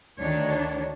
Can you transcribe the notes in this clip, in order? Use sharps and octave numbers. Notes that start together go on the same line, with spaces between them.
D2 D#3 D4 C#5